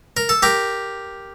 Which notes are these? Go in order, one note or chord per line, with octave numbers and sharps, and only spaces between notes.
A#4
A4
G4 A#4